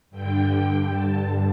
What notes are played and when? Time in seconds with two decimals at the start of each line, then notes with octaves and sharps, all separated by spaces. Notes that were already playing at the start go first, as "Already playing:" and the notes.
0.11 G2 D3 G5
0.50 G5
0.90 A5